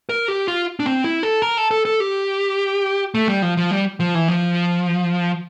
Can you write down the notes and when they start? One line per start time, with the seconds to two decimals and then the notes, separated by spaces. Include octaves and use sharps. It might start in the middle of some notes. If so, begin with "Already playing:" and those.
0.09 A#4
0.28 G4
0.48 F4
0.80 D4
0.86 C4
1.04 E4
1.23 A4
1.42 A#4
1.57 A4
1.71 A4
1.85 A4
2.00 G4
3.15 A3
3.28 G3
3.42 F3
3.57 F3
3.71 G3
4.00 F3
4.15 E3
4.28 F3